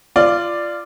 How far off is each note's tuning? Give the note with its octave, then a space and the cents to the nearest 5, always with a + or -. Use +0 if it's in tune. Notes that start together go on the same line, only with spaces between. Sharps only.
F4 -20 D5 +5